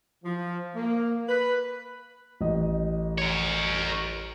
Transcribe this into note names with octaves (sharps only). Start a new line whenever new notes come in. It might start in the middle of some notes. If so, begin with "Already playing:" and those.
F3
A#3
B4
A1 D#5
A#4 C#5